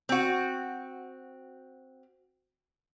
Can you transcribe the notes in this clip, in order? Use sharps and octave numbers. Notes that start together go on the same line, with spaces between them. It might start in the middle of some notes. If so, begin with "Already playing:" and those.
C4 F#4